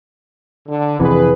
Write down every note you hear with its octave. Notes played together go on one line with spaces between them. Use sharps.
D3
F2 C3 E3 G#4 B4